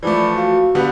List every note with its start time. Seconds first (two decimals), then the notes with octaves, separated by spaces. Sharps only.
0.03 E3 F3 A3 D5 B5 D6
0.35 F#4 F5
0.75 D3 G3 B3 F5